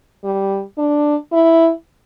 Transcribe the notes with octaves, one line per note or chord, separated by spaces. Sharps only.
G3
D4
E4